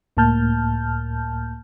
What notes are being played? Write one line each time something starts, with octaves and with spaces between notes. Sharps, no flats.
C#2 A2 A#3 A5 F6 G6